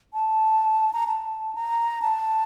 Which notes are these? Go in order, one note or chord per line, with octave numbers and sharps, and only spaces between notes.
A5
A#5
A5
A#5
A5